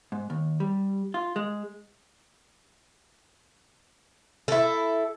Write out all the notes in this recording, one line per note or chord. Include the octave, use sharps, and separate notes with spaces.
G#2
D#2
G3
F4
G#3
E4 A4